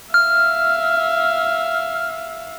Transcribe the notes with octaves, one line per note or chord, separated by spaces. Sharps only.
E5 F5 F6